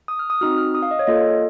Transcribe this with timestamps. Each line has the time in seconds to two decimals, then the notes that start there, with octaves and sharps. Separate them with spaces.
0.08 D#6
0.19 F6
0.30 D#6
0.41 C4 D#4 F#4 F6
0.58 F6
0.74 D#6
0.82 F5
0.91 D#5
0.99 C#5
1.07 A#3 F4 A4 D#5